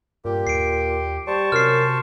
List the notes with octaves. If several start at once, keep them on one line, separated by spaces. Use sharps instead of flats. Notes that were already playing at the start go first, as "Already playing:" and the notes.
G2 A#2 G4
D#2 C7 D7
G3 C5 A5 C#6
F#2 C3 F6 C7